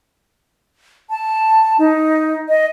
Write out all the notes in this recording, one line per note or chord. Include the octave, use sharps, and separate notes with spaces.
A5
D#4
D#5